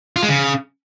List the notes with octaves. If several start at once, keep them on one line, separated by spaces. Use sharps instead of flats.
F4
G#3
C#3